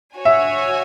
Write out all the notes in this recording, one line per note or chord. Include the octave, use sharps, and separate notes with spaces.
F#4 C#5 G#5
E5